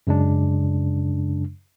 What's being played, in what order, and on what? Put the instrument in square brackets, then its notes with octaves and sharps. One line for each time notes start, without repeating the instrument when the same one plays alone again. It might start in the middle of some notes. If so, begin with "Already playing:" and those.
[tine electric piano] F#2 C#3 G#3 D4